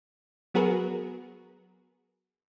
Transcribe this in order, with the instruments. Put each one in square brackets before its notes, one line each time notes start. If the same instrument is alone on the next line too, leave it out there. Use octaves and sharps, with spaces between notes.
[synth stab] F#3 B3 F#4 G#4 A#4 B4